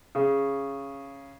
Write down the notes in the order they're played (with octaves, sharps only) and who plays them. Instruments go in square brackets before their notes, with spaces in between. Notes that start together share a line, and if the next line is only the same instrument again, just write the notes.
[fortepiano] C#3